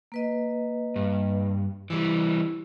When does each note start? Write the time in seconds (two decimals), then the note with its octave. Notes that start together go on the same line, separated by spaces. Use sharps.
0.12 A#3 B4 D#5
0.96 G2
1.90 E3 G3 E4